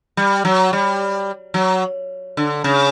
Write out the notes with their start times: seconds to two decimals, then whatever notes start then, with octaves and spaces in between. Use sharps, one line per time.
0.17 G3
0.45 F#3
0.73 G3
1.54 F#3
2.37 D3
2.64 C#3